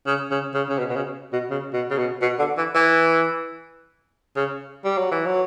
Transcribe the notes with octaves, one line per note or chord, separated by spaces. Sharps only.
C#3
C#3
C#3
C#3
B2
B2
C#3
B2
C#3
B2
C#3
B2
B2
D3
E3
E3
C#3
G3
F#3
E3
F#3